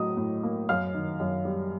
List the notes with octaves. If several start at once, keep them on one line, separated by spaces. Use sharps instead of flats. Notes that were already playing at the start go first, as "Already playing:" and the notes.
Already playing: A2 F#3 D#5 D#6
A2
A#3
F#2 F5 F6
D#3
F#2
G3